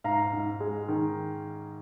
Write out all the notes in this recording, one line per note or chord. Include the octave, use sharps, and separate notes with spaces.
G#2 F5 A#5
G#2
G#3
D#3